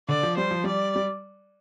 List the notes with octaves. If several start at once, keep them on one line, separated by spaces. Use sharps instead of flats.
D3 D5
F3
G3 C5
F3
G3 D5
G3